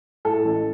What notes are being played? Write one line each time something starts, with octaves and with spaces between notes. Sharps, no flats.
A2 A4
A1